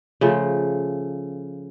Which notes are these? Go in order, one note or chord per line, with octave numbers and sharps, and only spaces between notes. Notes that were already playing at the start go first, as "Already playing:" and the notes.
C#3 F3 A3